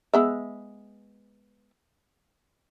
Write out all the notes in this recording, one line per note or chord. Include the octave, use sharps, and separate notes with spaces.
G#3 B3 E5